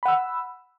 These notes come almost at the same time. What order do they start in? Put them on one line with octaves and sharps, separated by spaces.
B5 F#5 E6